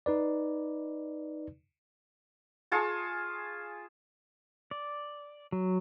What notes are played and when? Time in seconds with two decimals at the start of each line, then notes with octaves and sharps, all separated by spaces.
0.06 D#4 B4 D5
2.72 F4 G#4 A5 C#6
4.71 D5
5.52 F#3